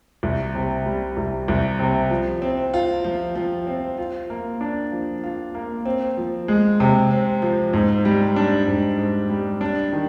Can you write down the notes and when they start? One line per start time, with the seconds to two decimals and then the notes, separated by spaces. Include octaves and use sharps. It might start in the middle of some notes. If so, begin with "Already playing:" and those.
0.23 C2
0.55 C3
0.85 G3
1.17 C2
1.48 C2
1.79 C3
2.10 F3
2.42 C4
2.74 F4
3.04 F3
3.35 F3
3.67 C4
3.98 F4
4.30 A#3
4.61 D4
4.92 F3
5.24 F4
5.55 A#3
5.85 C4
6.17 F3
6.48 G#3
6.80 C3
7.11 C4
7.42 F3
7.73 G#2
8.05 G3
8.36 D4
8.67 G#2
8.98 G#2
9.30 G3
9.61 D4
9.93 D#3